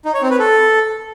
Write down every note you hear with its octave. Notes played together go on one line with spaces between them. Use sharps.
D#4
C#5
C4
B4
A4